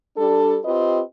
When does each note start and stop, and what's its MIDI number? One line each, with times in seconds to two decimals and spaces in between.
0.17 0.57 55
0.17 0.57 62
0.17 0.57 67
0.17 0.57 69
0.64 1.01 60
0.64 1.01 65
0.64 1.01 67
0.64 1.01 71
0.64 1.01 75